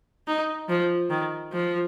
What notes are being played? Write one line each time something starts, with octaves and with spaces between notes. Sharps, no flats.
D#4
F3
D#3
F3